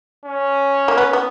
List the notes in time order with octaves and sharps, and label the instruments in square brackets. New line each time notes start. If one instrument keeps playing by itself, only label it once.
[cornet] C#4
[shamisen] A#3
B3
B3